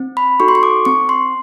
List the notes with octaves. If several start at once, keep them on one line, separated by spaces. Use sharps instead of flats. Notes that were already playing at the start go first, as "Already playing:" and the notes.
Already playing: C4
B5
D#4 F#4 A4 C#6
C6
C#6
D6
C4 C#6
C6